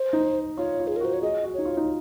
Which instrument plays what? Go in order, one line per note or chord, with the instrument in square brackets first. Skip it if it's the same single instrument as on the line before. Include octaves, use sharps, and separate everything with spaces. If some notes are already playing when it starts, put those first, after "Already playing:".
Already playing: [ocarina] C5
[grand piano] D#4
[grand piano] F4 [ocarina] C#5
[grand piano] F4
[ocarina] G#4
A#4
[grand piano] F#4 [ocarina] C5
[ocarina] C#5
[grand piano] G#4 [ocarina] D#5
[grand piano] F#4
[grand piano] D#4 [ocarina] C#5
[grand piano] F4
D#4